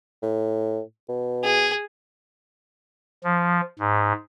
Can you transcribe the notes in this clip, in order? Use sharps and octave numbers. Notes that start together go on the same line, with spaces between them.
A2
B2
G#4
F3
G#2